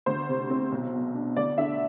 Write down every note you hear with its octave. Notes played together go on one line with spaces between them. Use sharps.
D2 C5
C3
C4
B1
B2
D4
D2 D5
D3 E5